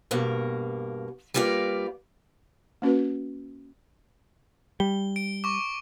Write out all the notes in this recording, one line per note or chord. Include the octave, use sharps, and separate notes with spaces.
G2 B2 A#3
G3 A#3 F4 B4 D5
A#3 C#4 F#4 B4
G3 G7
D7
C#6 D6